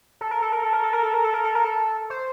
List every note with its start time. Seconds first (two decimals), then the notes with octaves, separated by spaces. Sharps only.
0.21 A4
0.31 A#4
0.42 A4
0.52 A#4
0.63 A4
0.73 A#4
0.83 A4
0.93 A#4
1.03 A4
1.14 A#4
1.24 A4
1.34 A#4
1.44 A4
1.55 A#4
1.64 A4
2.10 C5